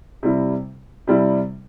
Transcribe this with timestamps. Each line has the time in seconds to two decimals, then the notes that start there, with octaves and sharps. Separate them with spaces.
0.23 C3 G3 E4
1.07 C3 G3 E4